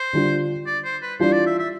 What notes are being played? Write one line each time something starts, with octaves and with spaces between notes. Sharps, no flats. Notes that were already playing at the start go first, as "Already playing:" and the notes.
Already playing: C5
D3 G3 D4 F4
D5
C5
B4
E3 G3 D4 F4 C5
D5
E5
E5